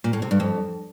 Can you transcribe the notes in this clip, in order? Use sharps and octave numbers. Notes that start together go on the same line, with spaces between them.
A#2
A2
C3
G2
F2